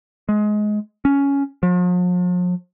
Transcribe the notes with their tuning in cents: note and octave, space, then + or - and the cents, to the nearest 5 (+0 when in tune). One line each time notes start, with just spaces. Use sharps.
G#3 +20
C#4 +10
F3 +45